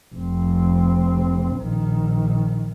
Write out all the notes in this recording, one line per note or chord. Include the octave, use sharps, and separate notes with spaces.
F1 C4
A#1 D#3